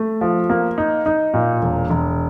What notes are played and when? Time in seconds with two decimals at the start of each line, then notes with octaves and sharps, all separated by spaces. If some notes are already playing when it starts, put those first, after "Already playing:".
Already playing: A3
0.21 F3
0.50 A#3
0.78 D#4
1.06 D#4
1.34 A#2
1.62 E1
1.90 E1